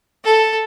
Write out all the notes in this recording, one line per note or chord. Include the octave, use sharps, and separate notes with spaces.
A4